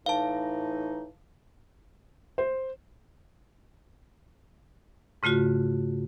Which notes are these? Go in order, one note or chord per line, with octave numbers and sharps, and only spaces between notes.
A2 E3 D#4 F5 A5
C5
G#2 C#3 A3 F4 F#4